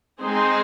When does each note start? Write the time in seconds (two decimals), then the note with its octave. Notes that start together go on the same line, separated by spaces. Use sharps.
0.21 G#3 C4 D#4 G#4 C5